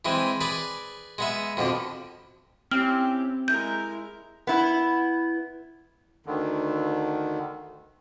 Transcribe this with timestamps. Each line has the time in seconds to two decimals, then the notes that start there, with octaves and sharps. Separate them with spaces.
0.05 E3 G#3 C4
0.40 G#4 B4 D5
1.18 G#3 B3 E5
1.57 F2 B2 D3
2.71 C4 C#4 E4 G4 F6
3.48 G#3 E4 A#4 G6
4.47 B3 E4
6.26 D2 D3 D#3